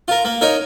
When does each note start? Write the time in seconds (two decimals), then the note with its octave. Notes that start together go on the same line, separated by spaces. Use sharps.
0.08 F4 A#4
0.25 A#3
0.41 D#4 A#4 C#5